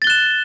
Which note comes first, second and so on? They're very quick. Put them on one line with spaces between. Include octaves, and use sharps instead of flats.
A6 G7 F#6 E7